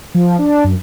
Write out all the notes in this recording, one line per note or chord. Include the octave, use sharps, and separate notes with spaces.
F3
D4
F#2